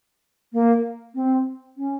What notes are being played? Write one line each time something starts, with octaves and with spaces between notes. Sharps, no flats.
A#3
C4
C#4